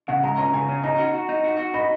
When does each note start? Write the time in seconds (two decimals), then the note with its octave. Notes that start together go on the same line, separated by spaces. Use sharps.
0.08 C#3 F#5
0.23 G#3 A#5
0.38 C#4 A#5
0.53 C#3 G#5
0.69 C#4
0.84 D#4 A#5
0.99 F#4
1.14 F#4
1.29 D#4
1.44 F#4
1.59 F#4
1.74 D#4 B5